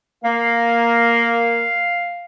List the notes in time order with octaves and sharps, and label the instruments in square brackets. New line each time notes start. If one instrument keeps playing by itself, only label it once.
[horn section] A#3 [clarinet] F5